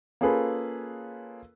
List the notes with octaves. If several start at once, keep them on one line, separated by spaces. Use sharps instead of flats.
A#3 C#4 F4 G#4 A4 B4